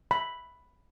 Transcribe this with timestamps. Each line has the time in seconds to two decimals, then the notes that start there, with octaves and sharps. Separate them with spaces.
0.11 B5